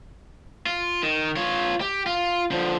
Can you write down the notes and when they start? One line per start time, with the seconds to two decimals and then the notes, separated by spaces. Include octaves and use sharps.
0.66 F4
1.03 D#3
1.36 F4 C#5
1.81 G4
2.06 F4
2.52 D3 F3